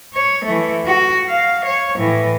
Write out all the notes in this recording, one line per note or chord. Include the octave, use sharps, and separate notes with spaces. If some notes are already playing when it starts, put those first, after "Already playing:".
C#5
E3 A3
F#4
F5
C#5
A2 E3